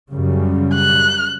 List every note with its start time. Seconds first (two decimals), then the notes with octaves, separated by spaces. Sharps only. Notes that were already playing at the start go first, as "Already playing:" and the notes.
0.11 F#2 C#3 G3
0.74 F#6